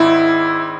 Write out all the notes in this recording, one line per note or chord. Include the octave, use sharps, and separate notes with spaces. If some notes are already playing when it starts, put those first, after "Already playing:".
Already playing: G#1 G#2 E4